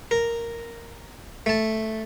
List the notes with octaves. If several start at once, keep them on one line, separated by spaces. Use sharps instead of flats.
A#4
A3 A5